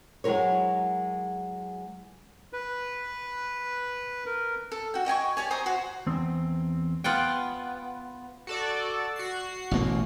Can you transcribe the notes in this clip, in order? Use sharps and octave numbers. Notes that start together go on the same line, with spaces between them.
F#3 G#3 E4 A#4 C#5
B4
A#4
A4
F#4 G5
D#5 G5 G#5 C#6
G4 C#5 D5 G#5
C5 G#5 A#5 D#6
F#4 C5
E2 C4
B3 F4 F#5 G5
F#4 A4 D5
F#4 C7
A1 B2 A#3